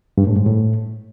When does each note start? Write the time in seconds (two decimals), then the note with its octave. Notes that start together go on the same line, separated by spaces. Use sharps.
0.18 G2
0.27 A2
0.36 G#2
0.46 A2